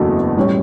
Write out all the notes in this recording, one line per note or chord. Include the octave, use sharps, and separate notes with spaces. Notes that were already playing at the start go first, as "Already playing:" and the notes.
Already playing: F#1 E2 B2 A3 D4
A2 G3 C#4